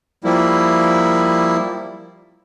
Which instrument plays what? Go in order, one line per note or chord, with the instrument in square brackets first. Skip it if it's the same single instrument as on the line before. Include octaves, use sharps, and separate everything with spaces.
[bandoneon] F3 G3 A#3 E4